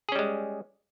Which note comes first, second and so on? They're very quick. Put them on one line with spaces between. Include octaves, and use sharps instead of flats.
G#4 C#4 G3 G#3